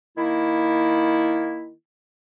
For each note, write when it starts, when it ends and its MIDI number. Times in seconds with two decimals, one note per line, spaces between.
0.17 1.73 51
0.17 1.73 58
0.17 1.73 64